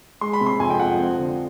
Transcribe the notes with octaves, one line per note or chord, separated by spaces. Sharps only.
G#3 C6
B5
C3
C6
F2 G#5
G5
F3 F#5
C4
D3